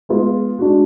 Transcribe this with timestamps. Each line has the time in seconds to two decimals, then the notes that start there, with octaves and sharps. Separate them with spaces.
0.09 G#3 B3 F4 G#4
0.59 G#3 D4 F#4